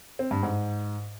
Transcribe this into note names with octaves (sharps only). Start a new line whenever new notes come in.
C4
G2
G#2